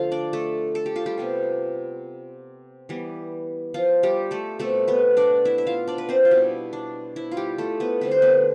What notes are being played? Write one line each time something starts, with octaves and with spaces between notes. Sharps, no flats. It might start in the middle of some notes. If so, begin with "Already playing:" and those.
Already playing: D3 F3 A3 F4 C5 F5
D4 D5
A3 A4
A4
G4
F4
G3 G4
C3 G3 B3
E3 G3 B3
F3 F4
G3 G4
A3 A4
B2 G3 A3 C4 A4
B3 B4
D4 D5
E4 E5
E5
F4 F5
D4 D5
B4
C4 C5
F4
B2 G3 B3 E4
D4
E4
F4
G3 G4
A3 A4
B3 B4
D3 G3 C4 B4
C5
B3 B4